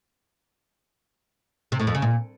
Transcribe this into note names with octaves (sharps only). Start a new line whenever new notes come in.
C3
A2
F2
C#3
A#2